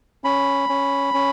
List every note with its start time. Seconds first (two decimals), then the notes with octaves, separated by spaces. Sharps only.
0.24 C#4 B5
0.69 C#4
1.14 C#4